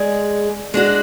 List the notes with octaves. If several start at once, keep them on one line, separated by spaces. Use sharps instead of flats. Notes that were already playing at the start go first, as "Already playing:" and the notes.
Already playing: G#3 G#4 D5
G#3 D4 F#4